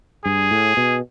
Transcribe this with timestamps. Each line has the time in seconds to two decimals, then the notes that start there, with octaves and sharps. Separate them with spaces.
0.25 G2 G#4
0.51 A2
0.77 B2